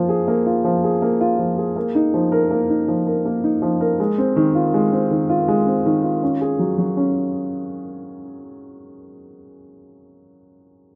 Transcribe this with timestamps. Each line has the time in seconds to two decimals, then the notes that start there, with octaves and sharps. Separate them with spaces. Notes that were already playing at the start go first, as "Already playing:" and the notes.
Already playing: F3 A#3 F4
0.09 G#4
0.28 A#3
0.46 F4
0.64 F3
0.84 G#4
1.02 A#3
1.21 F4
1.39 F3
1.58 G#4
1.76 A#3
1.95 D#4
2.14 F3
2.32 A#4
2.51 A#3
2.69 D#4
2.88 F3
3.07 A#4
3.25 A#3
3.44 D#4
3.62 F3
3.81 A#4
4.00 G#3
4.18 C4
4.36 D#3
4.55 F4
4.74 G#3
4.92 C4
5.11 D#3
5.29 F4
5.48 G#3
5.67 C4
5.86 D#3
6.04 F4
6.23 C#4
6.41 G#4
6.59 F#3
6.78 F#3
6.97 C#4